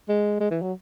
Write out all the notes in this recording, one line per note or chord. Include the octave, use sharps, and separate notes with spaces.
G#3
G#3
E3
F#3